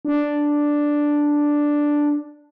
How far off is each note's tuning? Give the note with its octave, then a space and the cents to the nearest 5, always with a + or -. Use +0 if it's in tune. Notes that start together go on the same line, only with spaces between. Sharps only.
D4 +0